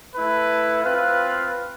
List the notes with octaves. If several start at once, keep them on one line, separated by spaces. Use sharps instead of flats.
A3 E4 B4
C4 F4 B4 F5